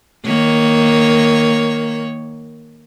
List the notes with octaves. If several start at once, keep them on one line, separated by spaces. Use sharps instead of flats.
D#3 A#3 C#5